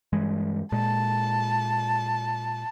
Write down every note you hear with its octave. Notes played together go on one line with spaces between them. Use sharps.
G2 E3 G#3
A#2 G#3 A5